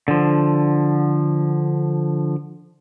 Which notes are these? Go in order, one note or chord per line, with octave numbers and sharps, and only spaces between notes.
D3 F3